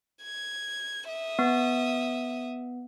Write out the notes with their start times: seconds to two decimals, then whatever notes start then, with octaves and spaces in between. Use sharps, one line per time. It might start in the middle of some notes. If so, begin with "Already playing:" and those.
0.24 G#6
1.08 E5 D#6
1.39 B3